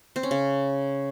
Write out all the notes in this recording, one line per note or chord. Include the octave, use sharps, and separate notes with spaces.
C4
C#4
C#3